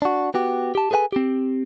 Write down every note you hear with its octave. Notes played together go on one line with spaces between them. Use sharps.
D4 F#4
B3 F#4 G4
G4 A5
G#4 A4 B4 F#5 G#5
C4 G4